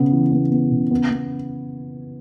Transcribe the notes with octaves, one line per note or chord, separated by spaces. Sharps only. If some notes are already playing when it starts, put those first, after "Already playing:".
Already playing: C#3 B3
E3
B3
B3
C#3
B3
B3